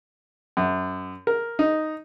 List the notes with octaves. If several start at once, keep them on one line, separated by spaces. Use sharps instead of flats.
F#2
A#4
D#4